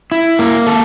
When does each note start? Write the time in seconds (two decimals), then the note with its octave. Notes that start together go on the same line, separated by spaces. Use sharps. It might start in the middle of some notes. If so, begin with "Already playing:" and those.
0.12 E4
0.39 A#3
0.66 A4